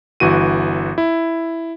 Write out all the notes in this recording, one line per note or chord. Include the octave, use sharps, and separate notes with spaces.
G1 E3 F#4 D#7
E4